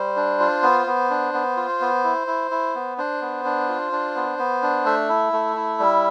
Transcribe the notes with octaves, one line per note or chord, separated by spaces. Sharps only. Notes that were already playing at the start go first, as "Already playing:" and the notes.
Already playing: G3 C5
D4
F4
B3
B3
D4
B3
F4
B3
E4
E4
E4
B3
D4 C5
B3
D4
F4
D4
B3
B3
D4
A3 E5
E4
A3
E4
G3